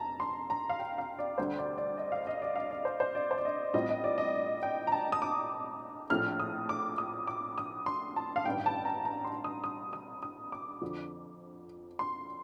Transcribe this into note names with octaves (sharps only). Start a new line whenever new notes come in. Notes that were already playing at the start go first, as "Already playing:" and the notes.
Already playing: F1 F2 A5 A#5
C6
A#5
F5
G5
F5
D5
D2 D3 G3 C5
D5
D5
D#5
F5
D#5
D5
F5
D5
C5
C5
D5
C5
D5
D#5
A1 A2 G3 C4 F4 D#5
D#5
D5
D#5
G5
A#5
A5
D#6
D6
A#1 A2 F3 A3 F6
D#6
D6
D#6
D6
D#6
C6
A5
F5
A1 G2 D#3 G5
A5
A#5
A#5
C6
D#6
D#6
D#6
D#6
D6
F2 D3 F3
C6